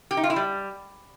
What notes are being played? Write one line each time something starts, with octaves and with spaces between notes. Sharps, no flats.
G4
D#4
F4
E4
G3